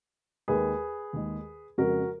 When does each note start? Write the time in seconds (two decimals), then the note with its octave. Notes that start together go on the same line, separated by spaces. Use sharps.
0.48 D#2 D#3 G#3 G#4 B4
1.13 D#2 D#3 G#3
1.78 F2 C#3 G#3 F#4 A#4